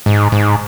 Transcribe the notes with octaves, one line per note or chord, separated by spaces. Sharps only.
G#2
G#2